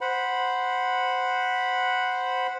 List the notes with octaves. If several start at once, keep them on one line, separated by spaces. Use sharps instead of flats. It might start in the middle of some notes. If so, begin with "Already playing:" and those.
C5 F#5 B5